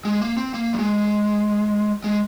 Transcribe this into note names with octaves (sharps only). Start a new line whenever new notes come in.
G#3
A#3
C4
A#3
F#3
G#3
G#3